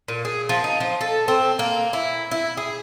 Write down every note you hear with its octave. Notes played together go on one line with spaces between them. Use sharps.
A#2
G#4
F3
D#4
F3
A4
C4
A#3
E4
E4
G#4